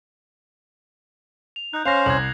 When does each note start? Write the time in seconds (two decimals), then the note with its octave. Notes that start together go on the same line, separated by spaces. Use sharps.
1.56 F7
1.74 D#4 F#6 G6
1.86 C#4 C5 F5 A#6 C7 F7
2.06 C2 G#6 F#7